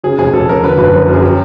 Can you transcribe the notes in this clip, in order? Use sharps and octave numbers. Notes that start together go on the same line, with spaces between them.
C#3 G#4
F1 G#4
F1 A4
E2 A#4
D3 B4
F#1 B4
F3 A#4
F#2
G#4
F#3 G4